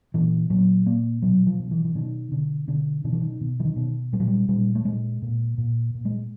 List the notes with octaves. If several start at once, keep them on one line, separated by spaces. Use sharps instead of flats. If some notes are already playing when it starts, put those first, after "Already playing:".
A#2 E3
A#2 F#3
A#2 A#3
B2 F#3
F3
B2
E3
E3
B2 D#3
B2 D3
B2 D3
B2 D#3
E3
D#3
B2
E3
D#3
B2
A#2 G3
F#3
G3
A#2 G3
A3
A#2 G#3
A#2
A#2
A#2
G#3